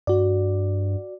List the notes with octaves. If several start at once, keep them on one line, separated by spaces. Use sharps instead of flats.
G2 F#4 D5